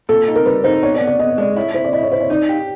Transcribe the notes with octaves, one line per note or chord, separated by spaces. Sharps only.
A#2 A4
D#4
A#4
G3 B4
D#4 C5
B3 C#5
D5
B3
D5
B3 D#5
G#3 D5
E4 C#5
E4 C5
D5
E4 D#5
C#5
E4 C5
C#5
D#4 D5
G4